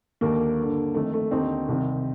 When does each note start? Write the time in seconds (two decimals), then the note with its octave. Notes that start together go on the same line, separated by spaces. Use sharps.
0.21 D#2 D3 A#3
0.58 G2 D3
0.94 F2 D#3 A3
1.13 A3
1.31 D#2 D3 C4 D#4
1.68 C2 C3 D#3